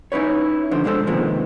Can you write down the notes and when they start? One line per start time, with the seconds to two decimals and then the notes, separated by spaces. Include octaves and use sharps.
0.12 C#4 D#4 E4 B4 C#5
0.71 D3 F3 C5
0.84 B2 G#3 D4 A4 C5
1.07 C3 D#3 F3 G#3 A#3 B3